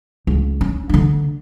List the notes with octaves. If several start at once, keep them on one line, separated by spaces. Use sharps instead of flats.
C#2
C#4
D3 D4